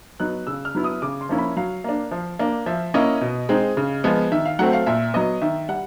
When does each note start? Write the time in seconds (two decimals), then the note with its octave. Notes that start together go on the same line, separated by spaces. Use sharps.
0.20 F#3 B3 D#4 F#6
0.47 C#3 E6
0.65 F6
0.75 F#3 B3 E4
0.84 D#6
1.02 C#3 D6
1.21 C6
1.29 F3 A#3 C#4 E4
1.38 B5
1.56 F#3 F5
1.84 A#3 D4
2.11 F3
2.39 A#3 D4
2.66 F3 E5
2.94 A#3 C#4 E4 D#5
3.21 B2
3.49 G#3 C4 D#4
3.77 C#3
4.04 F3 G#3 B3
4.31 D#3 E5
4.45 F5
4.59 F#3 A3 C4 F#5
4.73 F5
4.86 A#2 E5
5.14 F#3 B3 D#5
5.41 D#3 E5
5.69 G3 F#5